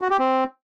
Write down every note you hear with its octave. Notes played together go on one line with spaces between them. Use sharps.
F#4
G4
C4